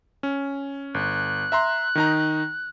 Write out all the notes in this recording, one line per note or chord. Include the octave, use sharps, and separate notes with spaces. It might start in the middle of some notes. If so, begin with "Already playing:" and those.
C#4
G1 F#6
E5 A#5 C6
D#3 D#4 A#5